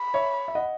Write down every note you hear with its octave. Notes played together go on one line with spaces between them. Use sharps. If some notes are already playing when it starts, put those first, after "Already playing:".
Already playing: B5
C#5 E5
E5
D#5 F#5